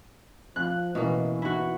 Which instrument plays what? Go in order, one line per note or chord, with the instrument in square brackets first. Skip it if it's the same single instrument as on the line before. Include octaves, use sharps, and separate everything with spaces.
[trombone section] F3 [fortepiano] F#6
[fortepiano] A1 [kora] B2 A#3 [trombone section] E3
[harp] E4 F#4